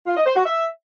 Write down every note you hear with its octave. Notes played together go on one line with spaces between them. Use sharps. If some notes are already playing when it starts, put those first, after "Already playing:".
F4
D#5
C5
F#4
E5